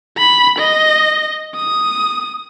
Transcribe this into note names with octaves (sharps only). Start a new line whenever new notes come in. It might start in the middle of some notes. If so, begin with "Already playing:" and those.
B5
D#5
D#6